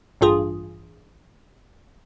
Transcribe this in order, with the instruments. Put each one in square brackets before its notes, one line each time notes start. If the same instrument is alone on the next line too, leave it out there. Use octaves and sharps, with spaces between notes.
[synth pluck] A1 G2 F4 G#4